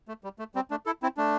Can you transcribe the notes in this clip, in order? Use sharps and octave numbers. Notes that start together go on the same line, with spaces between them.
A3
G3
A3
G3 C4
A3 D4
E4 A4
C4 E4
A3 D4